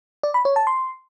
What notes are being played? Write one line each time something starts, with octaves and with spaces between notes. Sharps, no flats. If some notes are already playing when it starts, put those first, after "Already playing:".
D5
B5
C#5
A5
C6